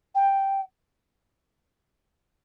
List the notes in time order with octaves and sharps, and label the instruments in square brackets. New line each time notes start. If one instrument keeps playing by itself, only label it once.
[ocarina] G5